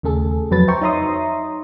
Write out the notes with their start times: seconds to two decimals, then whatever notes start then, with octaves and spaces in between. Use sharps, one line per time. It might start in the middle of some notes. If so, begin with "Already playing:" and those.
0.03 D#2 C#3 A3 G#4 A4
0.51 F2 F#3 B4 A6
0.68 C5 E5 G5 A#5 C#6
0.81 D#4 C#5 E5 A#5 C6 D#6